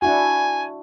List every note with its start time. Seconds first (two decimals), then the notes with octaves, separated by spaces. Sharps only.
0.02 D4 E4 F#4 G#5